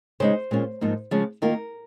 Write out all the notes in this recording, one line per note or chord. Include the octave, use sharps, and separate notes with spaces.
C#3 G#3 D#4 C5
A#2 G#3 C#4 F4
G#2 F3 A#3 D#4
C#3 F3 G#3 C#4
D#3 A#3 F4 A#4